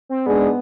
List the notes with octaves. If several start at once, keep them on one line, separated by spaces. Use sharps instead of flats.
C4
G#2 G#3 B3 D4 G#4 D5